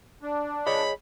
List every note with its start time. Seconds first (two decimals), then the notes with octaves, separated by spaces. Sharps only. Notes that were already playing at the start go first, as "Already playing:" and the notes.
0.23 D4
0.67 G#4 C#5 D#5 B5